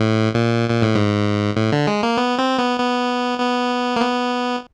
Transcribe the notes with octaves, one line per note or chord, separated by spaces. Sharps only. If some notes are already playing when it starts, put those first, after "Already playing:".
Already playing: A2
A#2
A#2
A2
G#2
A2
D3
G#3
A#3
B3
C4
B3
B3
B3
A#3
B3